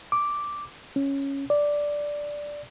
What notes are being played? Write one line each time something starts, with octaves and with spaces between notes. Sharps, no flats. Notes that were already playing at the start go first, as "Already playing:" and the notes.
D6
C#4
D5